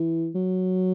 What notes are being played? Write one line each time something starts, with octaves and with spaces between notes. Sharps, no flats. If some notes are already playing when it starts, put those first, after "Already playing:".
Already playing: E3
F#3